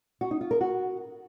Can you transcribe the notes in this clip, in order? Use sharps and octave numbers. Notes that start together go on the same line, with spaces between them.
F#4
D#4
F4
A#4
F#4